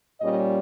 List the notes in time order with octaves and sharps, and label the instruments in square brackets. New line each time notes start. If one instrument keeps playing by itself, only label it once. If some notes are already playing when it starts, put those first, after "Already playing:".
[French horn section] A#2 G3 C#4 D#5